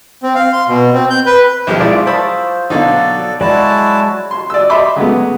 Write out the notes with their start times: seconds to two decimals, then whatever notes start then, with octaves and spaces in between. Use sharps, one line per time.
0.23 C4
0.35 F5
0.53 C6
0.68 B2
0.93 C4
1.10 G6
1.26 B4
1.67 B1 F3 G4
1.80 F#3 G#3 E4 F4 D5 D#6
2.07 C5 A5 B5 C#6 D#6 E6
2.70 B2 D3 F#3 D#4 A4 D5 F5
3.41 F#3 G#3 E4 F#4 D5 A5
4.31 C6
4.50 D5 E6
4.70 D#5 E5 B5 C6 D6
4.96 C#3 F#3 G#3 A3 B3